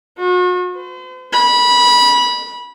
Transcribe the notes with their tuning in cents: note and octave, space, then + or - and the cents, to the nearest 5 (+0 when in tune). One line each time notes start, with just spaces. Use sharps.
F#4 -40
C5 -45
B5 -20